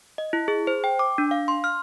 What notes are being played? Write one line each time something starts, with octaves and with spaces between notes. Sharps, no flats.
D#5
E4
G#4
C5
G5
D6
D4
F5
C6
F6